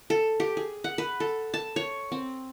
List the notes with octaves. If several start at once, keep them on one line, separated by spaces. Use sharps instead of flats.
A4
G4
G#4
F#5
B4
A4
A5
C#5
C4